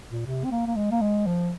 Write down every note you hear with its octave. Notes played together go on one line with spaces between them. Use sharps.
A#2
C3
C4
A#3
A#3
G#3
A#3
G#3
F3